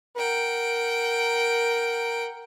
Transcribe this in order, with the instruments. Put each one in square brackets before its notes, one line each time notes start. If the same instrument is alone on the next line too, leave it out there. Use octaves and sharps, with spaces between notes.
[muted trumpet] A#4 [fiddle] F#5 G5